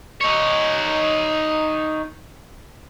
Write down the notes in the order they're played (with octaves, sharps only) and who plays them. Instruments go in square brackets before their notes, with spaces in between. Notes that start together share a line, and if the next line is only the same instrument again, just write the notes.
[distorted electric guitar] D#4 C#5